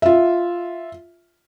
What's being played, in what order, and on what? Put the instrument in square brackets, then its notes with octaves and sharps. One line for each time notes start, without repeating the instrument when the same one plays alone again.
[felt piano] F4 E5